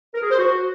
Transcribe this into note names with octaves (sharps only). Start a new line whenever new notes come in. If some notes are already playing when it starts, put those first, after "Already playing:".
A#4
G#4
C5
F#4